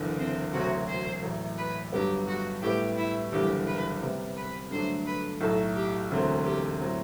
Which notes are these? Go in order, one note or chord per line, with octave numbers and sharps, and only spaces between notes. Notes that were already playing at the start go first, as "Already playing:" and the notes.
Already playing: F#1 E2 D3
C4
E1 D2 C3 F#3 C4 F#4
C5
A1 A2 F#3
B4
G1 G2 F#3 B3 G4
F#4
A2 G3 B3 G4
E4
F#1 E2 D3 G3 G4
B4
C3 G3 B3
B4
G2 D3 F#3 A3 D4 C5
B4
B1 A2 F#3 A4
G4
E1 D2 D3 F#3 C4
G4
A2 F#3 C4